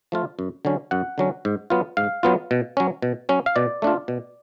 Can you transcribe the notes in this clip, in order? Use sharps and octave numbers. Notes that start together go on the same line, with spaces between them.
F3 A3 F4
F#2
D3 F#3 C#4
F#2 F#5
D3 F#3 C#4
G#2
F#3 B3 F4
G#2 F5
F#3 B3 F4
B2
F#3 C#4
B2
F#3 C#4
F5
B2 D5
A3 D4 F4
B2